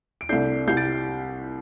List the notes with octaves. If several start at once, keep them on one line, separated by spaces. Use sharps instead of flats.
D7
C2 C3 A3 D4 G6 C7
C2 C3 G3 G6 C7
A6 D7